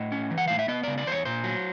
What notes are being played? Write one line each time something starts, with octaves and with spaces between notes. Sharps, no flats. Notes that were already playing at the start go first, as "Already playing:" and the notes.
Already playing: A2 D#5
C#4
E3
F#5
A2 F5
E5
B3 D#5
C#3 D5
D5
E2 C5
C#5
A#2 C5
F#3